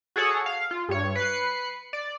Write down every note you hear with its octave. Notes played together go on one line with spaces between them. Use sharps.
F#4 G#4 A4 C#5 F#5
F5
F4
G2 C#5
B4 F#6 C7 C#7
D5